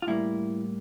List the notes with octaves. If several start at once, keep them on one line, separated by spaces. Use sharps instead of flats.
F4
A2 G3 A#3 E4